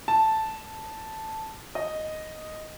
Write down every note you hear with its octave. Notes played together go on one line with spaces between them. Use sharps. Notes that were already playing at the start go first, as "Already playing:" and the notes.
A5
D#5